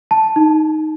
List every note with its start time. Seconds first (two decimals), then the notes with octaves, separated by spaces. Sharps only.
0.11 A5
0.36 D#4